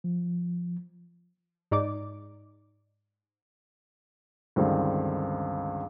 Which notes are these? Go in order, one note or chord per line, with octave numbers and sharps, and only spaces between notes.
F3
G#2 D#4 D5 D6
C#2 G2 D3 D#3 C4